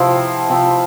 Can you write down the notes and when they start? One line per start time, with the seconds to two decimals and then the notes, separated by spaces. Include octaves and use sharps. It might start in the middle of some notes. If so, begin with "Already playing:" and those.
Already playing: C3 F3 C4 E4
0.49 C3 F3 C4 E4